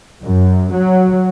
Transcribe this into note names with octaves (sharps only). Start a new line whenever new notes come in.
F#2
F#3